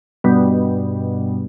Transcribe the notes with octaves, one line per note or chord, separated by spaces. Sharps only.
G2 B2